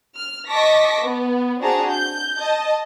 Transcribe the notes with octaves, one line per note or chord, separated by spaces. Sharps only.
F6
D#5 A5 C#6 D6 A#6 B6
B3
C4 D4 F#4 G#4 A5 A#5
G6
D#5 A5